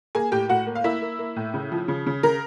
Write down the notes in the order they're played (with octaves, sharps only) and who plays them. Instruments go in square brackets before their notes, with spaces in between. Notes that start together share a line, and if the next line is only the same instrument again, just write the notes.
[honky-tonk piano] A#3 G#4 G#5
A2 G4 G5
A2 F#4 F#5
A#3
F5
A#3 E4 E5
A#3
A#3
A2
C#3
F3
C#3
C#3
C#3 A#4